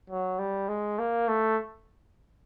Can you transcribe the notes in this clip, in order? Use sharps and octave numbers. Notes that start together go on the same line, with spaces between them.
F#3
G3
G#3
A#3
A3